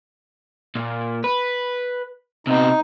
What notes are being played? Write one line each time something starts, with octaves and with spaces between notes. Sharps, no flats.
A#2
B4
C3 B3 D#4